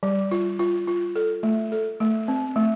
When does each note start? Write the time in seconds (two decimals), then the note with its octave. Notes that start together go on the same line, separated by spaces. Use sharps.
0.03 G3
0.31 F4
0.59 F4
0.87 F4
1.16 A4
1.43 A3
1.72 A4
2.00 A3
2.28 C4
2.56 A3